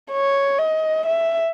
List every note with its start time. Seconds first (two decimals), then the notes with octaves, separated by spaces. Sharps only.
0.11 C#5
0.59 D#5
1.06 E5